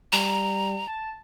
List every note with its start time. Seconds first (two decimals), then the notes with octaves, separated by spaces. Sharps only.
0.13 G3 A#5
0.87 A5